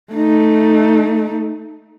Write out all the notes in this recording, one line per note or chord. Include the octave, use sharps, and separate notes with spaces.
A3 D#4